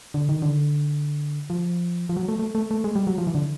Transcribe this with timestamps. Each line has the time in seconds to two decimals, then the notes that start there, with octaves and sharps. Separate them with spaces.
0.14 D3
0.29 D#3
0.42 D3
1.50 F3
2.09 F3
2.17 F#3
2.28 A3
2.39 A3
2.55 A3
2.71 A3
2.84 G#3
2.96 G3
3.07 F#3
3.18 F3
3.27 E3
3.35 D3